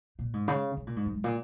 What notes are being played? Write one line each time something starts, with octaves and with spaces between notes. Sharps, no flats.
A#2
G#2
C#3
C#3
A#2
G#2
F#2
G#2
A#2